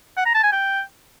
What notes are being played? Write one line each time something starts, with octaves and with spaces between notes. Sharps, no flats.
F#5
A#5
A5
G#5
G5